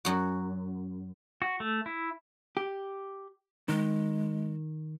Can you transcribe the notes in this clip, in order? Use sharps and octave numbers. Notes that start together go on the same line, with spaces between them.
F#2 F#4
F#4
A3
E4
G4
D#3 G#3